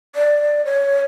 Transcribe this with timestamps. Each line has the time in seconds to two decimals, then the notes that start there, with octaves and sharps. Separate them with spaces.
0.16 D5
0.65 C#5